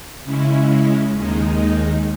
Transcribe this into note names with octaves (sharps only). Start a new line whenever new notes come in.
C#3 G#3 C#4 E4
D#2 D#3 G#3 D#4